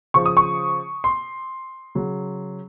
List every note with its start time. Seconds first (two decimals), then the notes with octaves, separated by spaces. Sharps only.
0.14 C#3 F3 C#6
0.26 D#6
0.37 C#6
1.04 C6
1.95 C#3 F#3